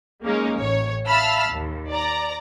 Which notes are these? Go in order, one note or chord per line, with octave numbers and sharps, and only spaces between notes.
G#3 A#3 C#4 D#4 A#4
A1 C#5
E5 F5 A5 B5 E6 F6
D#2
D5 A#5